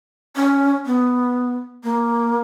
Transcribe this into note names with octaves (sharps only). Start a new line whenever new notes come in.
C#4
B3
A#3